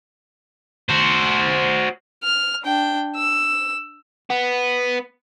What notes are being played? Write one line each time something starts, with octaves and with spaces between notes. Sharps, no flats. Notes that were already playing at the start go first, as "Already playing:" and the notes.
F#4 C5
F6
D4 G5
E6
B3